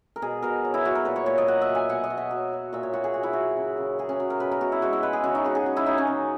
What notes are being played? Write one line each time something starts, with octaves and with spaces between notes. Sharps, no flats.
A#4
B2 G#4
B2 A#4
F#3
E4
F#3 F#4
A#4
A#2 B4
C#5
A#2 C#5
D#5
F#3 F#5
E5
F#3
G#5
B2 F#5
D#5
B2
E5
F#3
F#3
A#2 E5
C#5
A#2 F#4
G#4
F#3 F#4
E4
F#3 F#4
C#3
C#3
F#3 G#4
C#4
F#3
A#4
B2 B4
A#4
B2 F#4
E4
G#3 F#4
E4
G#3 B4
G#4
C#3 F#4
D#4
C#3 F#4
G#4
F#3
E4
F#3 D#4
C#4
C#3